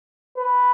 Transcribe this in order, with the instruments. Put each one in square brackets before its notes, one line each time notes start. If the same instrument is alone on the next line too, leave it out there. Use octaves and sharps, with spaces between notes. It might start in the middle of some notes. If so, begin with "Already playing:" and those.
[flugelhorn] B4